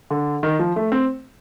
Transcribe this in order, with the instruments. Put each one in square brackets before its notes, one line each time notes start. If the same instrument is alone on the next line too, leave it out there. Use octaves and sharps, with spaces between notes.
[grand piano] D3
D#3
F3
A3
C4